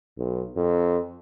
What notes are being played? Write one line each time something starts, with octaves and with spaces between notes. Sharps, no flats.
B1
F2